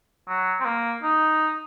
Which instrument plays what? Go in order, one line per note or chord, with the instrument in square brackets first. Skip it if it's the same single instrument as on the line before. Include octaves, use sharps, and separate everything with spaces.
[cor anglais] F#3
C4
A#3
D#4